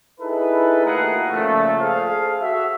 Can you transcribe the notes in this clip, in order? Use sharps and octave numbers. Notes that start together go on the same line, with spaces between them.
D#4 E4 G#4 A4 B4
D#2 A3 F4 G#4 A#4 F#5
A#2 C#3 F3 A3
G#4 A4 C5 F5
F#4 E5